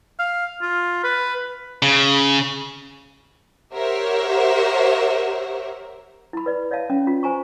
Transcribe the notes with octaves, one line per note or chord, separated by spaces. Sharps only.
F5
F4
B4
C#3
G4 A#4 C5 C#5 E5 F#5
E4 B5
B4 D5
C#5 D5 E5 F5 A5
C#4
F4
C5 G#5 A#5 C#6